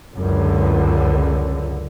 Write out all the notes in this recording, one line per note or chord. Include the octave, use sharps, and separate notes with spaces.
C#2 F#2 D3